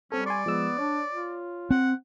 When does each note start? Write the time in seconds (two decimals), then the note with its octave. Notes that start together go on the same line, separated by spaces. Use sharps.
0.12 G3 C4 C#4 A4
0.26 D5 G#5 C6 C#6
0.46 F3 G#3 B3 E6
0.79 D4 C#5
1.11 F4
1.71 C4 F#5